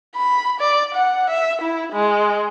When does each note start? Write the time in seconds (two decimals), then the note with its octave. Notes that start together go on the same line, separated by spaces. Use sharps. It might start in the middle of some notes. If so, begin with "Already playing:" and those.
0.16 B5
0.60 D5
0.94 F#5
1.30 E5
1.62 E4
1.93 G#3